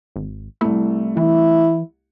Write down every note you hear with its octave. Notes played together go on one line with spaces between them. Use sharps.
G#1
C2 A3 E4
E3 E4